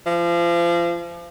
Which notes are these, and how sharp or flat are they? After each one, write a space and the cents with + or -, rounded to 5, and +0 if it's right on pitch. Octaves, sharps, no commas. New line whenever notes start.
F3 -30